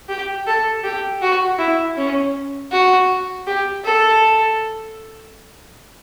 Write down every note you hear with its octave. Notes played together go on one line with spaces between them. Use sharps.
G4
A4
G4
F#4
E4
C#4
F#4
G4
A4